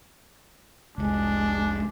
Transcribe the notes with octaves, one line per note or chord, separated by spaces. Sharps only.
F1 C2 G#3 D4